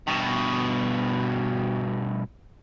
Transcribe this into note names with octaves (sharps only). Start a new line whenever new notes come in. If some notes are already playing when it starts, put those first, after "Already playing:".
G2 B2